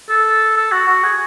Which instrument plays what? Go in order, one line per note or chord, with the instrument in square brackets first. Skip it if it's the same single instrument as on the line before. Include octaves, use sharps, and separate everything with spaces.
[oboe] A4
A4
F#4
F#4
G#4